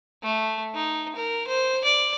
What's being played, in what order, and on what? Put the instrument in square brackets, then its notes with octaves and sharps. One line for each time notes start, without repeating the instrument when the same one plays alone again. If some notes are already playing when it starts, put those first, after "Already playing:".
[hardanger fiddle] A3
D#4
A#4
C5
D5